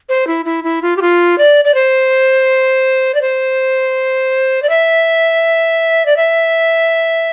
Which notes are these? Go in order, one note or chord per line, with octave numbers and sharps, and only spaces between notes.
C5
E4
E4
E4
F4
G4
F4
D5
D5
C5
D5
C5
D5
E5
D5
E5